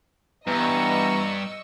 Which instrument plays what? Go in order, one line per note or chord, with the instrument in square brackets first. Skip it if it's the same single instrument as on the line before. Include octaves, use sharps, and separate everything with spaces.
[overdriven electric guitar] G2 [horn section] E3 G3 B3 [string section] D#5 C#6 E6 [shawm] A#5